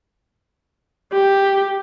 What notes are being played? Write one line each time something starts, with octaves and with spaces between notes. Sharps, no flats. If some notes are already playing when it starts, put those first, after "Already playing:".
G4